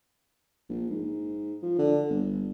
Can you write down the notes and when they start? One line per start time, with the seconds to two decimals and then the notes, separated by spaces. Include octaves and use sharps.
0.69 A#1
0.90 G#2
1.62 F3
1.79 D3
2.10 G1